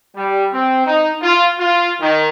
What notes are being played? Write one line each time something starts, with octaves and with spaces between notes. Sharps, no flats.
G3
C4
D#4
F4
F4
D#3